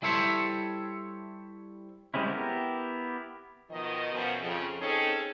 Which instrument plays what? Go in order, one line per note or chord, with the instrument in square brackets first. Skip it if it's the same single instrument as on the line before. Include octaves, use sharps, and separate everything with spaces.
[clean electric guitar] G3 E4 A4 C5 C#5 E5
[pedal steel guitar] G3 G#3 C4 C#4 E4
B3 E4 G4 A#4
[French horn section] B2 D#3 F3 D#5
F#2 B2 F3
F2 C#3
C4 C#4 D#4 G#4 A4 C#5